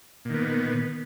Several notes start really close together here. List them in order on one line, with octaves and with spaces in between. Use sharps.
A#2 D#3 B3